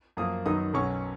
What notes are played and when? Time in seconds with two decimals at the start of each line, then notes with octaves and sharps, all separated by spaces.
0.17 F#2 F3 A#3 D#6
0.46 F#2 D#3 F#3 B3 D#4 D#6
0.74 B1 B2 F#3 C#4 C#6